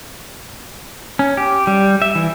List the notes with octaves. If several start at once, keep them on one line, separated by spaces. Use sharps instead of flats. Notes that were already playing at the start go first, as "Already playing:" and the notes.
C#4
G4
G3
E5
E3